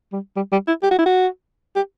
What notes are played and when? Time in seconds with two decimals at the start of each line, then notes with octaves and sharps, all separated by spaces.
0.12 G3
0.36 G3
0.52 G3
0.67 E4
0.83 G4
0.91 F#4
0.98 E4
1.06 F#4
1.76 G4